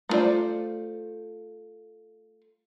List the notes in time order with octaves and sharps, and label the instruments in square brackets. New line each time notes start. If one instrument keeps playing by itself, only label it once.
[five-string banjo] A3 B3 F4 C5 D5